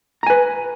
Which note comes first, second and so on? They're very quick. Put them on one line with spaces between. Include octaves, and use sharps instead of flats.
A#5 G#5 B4